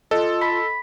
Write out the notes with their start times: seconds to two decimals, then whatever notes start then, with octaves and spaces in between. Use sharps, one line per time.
0.11 F4 A4 D#5
0.41 B5 B6